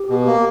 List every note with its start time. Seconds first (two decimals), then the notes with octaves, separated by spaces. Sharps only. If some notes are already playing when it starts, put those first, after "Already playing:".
Already playing: G4
0.09 B2
0.27 A#3